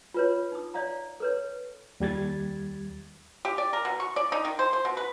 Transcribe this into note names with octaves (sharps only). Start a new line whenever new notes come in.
F4 B4 C#5
D#4 D#6
C#5 D5 E5 F5 A#5
A4 B4 C#5
D#2 G3 G#6 A6
G4
D5
A#4
B2
C#6
D5
D#4
D#3
C5
C5
B2
B4